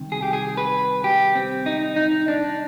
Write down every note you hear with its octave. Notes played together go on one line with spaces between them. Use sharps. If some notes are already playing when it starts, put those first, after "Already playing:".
Already playing: C2 C3 D#3
G#4
G4
G#4
B4
G4
C4
D#4
D#4
D4